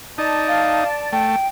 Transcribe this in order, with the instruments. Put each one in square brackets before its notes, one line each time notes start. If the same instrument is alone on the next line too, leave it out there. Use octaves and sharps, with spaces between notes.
[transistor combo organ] D#4 [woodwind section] D5 A5
[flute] F5
[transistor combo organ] A3 [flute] G5